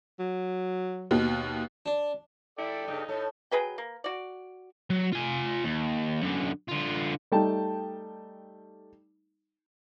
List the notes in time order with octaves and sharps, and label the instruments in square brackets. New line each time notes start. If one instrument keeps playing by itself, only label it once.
[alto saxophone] F#3
[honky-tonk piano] D#2 B2
[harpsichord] D4
[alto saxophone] E4 [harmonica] A4 D5 G5
[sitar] G2 C#3 [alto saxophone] D#4
[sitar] A2 A4 [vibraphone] C#5
[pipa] F#3 G#4 B4 G5
A#3
F#4 D5
[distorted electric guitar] F#3
F4 G#5
D#2
F#2 D3
D3 F4
[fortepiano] G3 A3 D#4 G5 A5